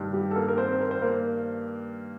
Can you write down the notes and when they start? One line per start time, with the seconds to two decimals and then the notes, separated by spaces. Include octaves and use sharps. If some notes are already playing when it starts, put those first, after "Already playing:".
Already playing: G2 D#3
0.13 G3 G4
0.31 A4
0.36 A#3 A#4
0.48 A#4
0.58 C4 C5
0.81 A#4
0.91 C5
1.02 A#3 A#4